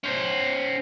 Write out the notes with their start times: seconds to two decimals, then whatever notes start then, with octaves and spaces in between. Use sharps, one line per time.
0.04 C#4 C5